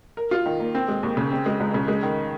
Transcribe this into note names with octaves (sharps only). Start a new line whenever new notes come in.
A#4
F4
D#3
A#3
C4
G#3
D#2
C#3
C4
G#3
C#2
C#3
G#3
D#3